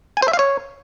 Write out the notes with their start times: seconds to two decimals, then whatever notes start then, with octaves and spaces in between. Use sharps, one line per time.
0.17 G#5
0.22 C5
0.28 E5
0.33 F5
0.39 C#5